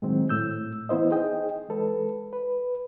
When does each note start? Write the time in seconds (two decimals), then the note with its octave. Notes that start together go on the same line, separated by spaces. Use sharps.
0.02 A2 D#3 F#3 G#3 C4
0.29 A2 E6 G6
0.89 E3 B3 E4 C5 D#5
1.11 D#4 G#4 D#5 G5
1.69 E3 G#3 A4 B4
2.33 B4